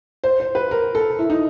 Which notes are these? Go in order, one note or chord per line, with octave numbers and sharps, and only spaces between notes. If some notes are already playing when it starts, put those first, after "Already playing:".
C5
C5
B4
A#4
A4
E4
D#4